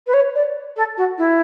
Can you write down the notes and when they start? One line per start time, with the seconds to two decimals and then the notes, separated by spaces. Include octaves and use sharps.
0.07 B4
0.13 C#5
0.35 D5
0.76 A4
0.97 F#4
1.18 E4